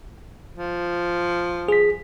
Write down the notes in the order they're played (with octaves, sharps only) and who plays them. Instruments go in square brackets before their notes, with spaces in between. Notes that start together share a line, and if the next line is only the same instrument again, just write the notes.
[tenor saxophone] F3
[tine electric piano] G#4 B6